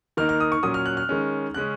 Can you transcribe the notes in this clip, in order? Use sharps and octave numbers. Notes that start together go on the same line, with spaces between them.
D#3 A#3 D#4 F6
F6
D#6
C#6
A#2 F#3 C#4 D#6
F6
F#6
F6
D#3 G#3 C#4
C#3 G#3 C#4 F#6